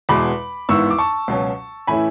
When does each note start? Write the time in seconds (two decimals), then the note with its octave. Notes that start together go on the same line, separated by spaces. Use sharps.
0.09 E2 B2 G#3 B5 D6
0.69 G#1 G#2 E3 B3 E4 C#6 E6
0.91 D6
0.98 A5 C#6
1.28 C#2 B2 F#3 C#4
1.87 A2 E3 A3 C#4 E4 G#5 B5